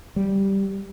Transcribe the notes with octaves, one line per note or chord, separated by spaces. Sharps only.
G3